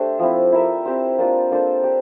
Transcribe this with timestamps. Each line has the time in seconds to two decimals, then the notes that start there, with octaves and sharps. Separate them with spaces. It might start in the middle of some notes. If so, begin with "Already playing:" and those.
Already playing: A3 D4 G4 C5 E5
0.19 F3 C4 E4
0.52 E4 A#4 E5
0.85 C4 G4 C5
1.18 A#3 D4 F4
1.51 A#3 D4 A4 C5
1.84 G4